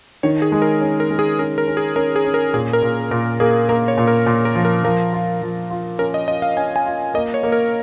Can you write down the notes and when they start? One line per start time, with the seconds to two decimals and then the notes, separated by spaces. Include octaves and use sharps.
0.23 D#3 C#5
0.42 G#4
0.52 G#3
0.62 A#4
0.81 C#4
1.00 A#4
1.10 G#3
1.19 G#4
1.39 C#4 A#4
1.58 A#4
1.67 C#4
1.77 G#4
1.96 C#4 A#4
2.16 G#4
2.25 C#4
2.34 A#4
2.54 A#2 G#4
2.73 A#4
2.82 A#2
3.11 A#2 A#4
3.40 A#3 G#4
3.69 A#3 A#4
3.88 C#5
3.97 A#2
4.08 A#4
4.26 A#2
4.45 A#4
4.55 F3
4.65 A#4
4.84 F3 A#4
5.13 F4
5.42 F3
5.70 F4
5.99 C#4 A#4
6.14 D#5
6.28 F4 D#5
6.42 F5
6.57 C#4 G#5
6.76 G#5
6.86 F4
7.14 A#3 D#5
7.34 C#5
7.43 A#3
7.52 A#4